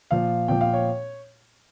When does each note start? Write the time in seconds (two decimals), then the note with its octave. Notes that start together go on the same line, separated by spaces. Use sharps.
0.11 A#2 F3 F5
0.48 A#2 F3 G5
0.61 F5
0.73 C#5